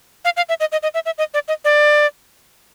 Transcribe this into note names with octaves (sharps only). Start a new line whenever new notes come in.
F5
F5
E5
D#5
D#5
D#5
E5
E5
D#5
D5
D#5
D5